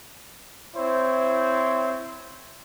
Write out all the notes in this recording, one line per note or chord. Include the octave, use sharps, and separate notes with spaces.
C4 E4 C5 C#5